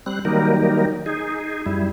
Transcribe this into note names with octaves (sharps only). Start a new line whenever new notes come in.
G3 C4 F#6
D#3 F#3 G3 A#3 D#4 A#4
D#4 G#4
F#2 G3 E4